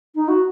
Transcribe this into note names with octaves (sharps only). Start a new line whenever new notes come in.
D#4
F#4